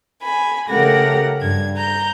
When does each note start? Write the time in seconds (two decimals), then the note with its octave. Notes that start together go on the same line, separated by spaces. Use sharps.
0.22 G#5 B5
0.68 C#3 A3 G4 A#4 F#5 A#6
1.41 G2 G#6
1.77 A#5 G6